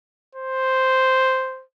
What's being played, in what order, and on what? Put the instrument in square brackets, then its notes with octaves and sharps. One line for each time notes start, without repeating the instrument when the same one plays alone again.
[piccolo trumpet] C5